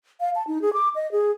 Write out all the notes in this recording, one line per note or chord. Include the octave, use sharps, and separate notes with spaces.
F5
A5
D#4
G#4
D6
D#5
G#4